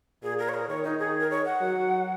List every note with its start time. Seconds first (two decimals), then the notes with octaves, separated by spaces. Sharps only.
0.23 A#2 G#4
0.39 A#4
0.49 C#5
0.54 A#4
0.69 D#3 C#5
0.84 D#4
0.99 G#4
1.21 A#4
1.30 C#5
1.45 F#5
1.61 F#3